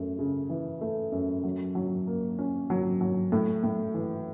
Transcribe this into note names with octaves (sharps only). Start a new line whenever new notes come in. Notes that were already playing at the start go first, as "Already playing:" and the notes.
Already playing: F#2 A3
C#3
E3
A3
F#2
F#3
F#3
A#3
C#4
F#3
F#3
A2
A2
E3